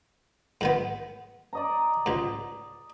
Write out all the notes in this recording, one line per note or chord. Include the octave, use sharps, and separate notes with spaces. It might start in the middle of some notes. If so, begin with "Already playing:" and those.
G#2 D#3 B3
D5 D#5 A#5
C#2 G#2